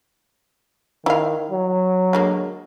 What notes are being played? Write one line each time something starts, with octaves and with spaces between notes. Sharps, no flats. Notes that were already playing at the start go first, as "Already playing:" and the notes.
D#3 E4 F5
F#3
D3 G#3 A#3